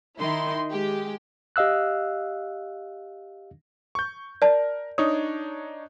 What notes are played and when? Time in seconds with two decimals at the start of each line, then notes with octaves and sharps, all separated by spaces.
0.18 D#3 D#4 E4 C6
0.70 G#3 G4
1.56 G4 D#5 F5 E6 F#6
3.95 C#6 G6
4.42 A#4 D5 A5
4.98 D4 D#4 C#5 D#6